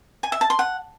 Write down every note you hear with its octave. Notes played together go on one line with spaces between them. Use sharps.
G#5
E5
A5
C6
F#5